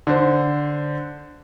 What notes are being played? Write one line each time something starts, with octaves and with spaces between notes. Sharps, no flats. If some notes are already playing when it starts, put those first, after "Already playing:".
D3 D4 C5